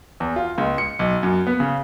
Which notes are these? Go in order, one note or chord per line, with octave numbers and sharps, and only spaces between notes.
E2
F4
C#2
C#7
B1
F#2
B3
C#3